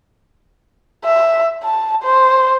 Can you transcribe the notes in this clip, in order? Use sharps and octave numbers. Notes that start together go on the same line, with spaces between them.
E5
A5
C5